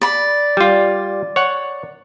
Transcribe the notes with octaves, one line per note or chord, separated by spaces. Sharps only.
D5 B5
G3 F4
C#5 F#5